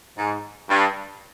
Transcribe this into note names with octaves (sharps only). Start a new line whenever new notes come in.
G#2
G2